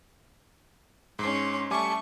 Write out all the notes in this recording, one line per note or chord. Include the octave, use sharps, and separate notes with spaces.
G#2 C#4 C6
G3 A3 G#5 C#6 D6